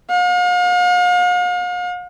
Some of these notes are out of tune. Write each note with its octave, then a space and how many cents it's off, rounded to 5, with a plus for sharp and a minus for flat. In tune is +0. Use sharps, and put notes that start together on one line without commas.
F5 +40